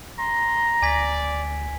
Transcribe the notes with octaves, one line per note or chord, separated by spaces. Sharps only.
A#5 C6
D2 D5 G#5 G#6 B6